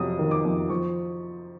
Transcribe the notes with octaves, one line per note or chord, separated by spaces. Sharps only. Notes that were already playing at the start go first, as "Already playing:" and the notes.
Already playing: F2 C3 F#3 D#6
D#3
D6
F2
F3 C#6